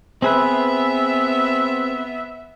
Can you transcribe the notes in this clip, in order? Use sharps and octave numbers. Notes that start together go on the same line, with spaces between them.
B3 C4 G#4 B4 E5